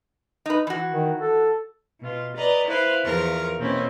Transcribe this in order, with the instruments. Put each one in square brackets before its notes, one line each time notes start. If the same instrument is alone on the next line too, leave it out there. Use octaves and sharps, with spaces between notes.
[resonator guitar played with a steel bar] D#4 B4
E3 F#4
[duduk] D#3
A4
[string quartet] B2 F4
B4 D5 D#5 A#5
E4 B4 C5 F5
E2 F3 F4 A#4 C#6
B2 A#3 C4 C#4 E4